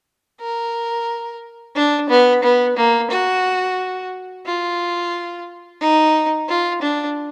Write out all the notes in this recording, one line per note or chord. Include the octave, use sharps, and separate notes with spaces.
A#4
D4
B3
B3
A#3
F#4
F4
D#4
F4
D4